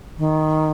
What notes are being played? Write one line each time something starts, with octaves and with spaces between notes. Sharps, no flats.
D#3